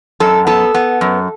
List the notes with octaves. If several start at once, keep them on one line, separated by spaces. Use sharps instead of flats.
F#2 A4
B3 A4
B3
F#2